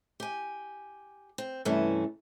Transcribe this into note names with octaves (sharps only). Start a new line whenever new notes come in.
G4 G#5
C4
G2 C3 E3 A3 C#4